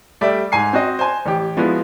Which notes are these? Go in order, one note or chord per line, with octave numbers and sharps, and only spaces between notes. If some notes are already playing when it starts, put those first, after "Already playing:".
G3 A3 D5 E5
G#2 G#5 C7
C4 F#4 D#5
C5 G#5
A1 G4
F3 G#3 B3 E4 F#4